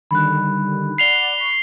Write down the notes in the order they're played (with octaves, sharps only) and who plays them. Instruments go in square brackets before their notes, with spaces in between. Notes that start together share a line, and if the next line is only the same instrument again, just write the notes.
[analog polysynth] D3 D#3 G3 [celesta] B5 F#6
[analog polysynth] D5 F#5 [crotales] C7 F7 G7
[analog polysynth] C#6 B6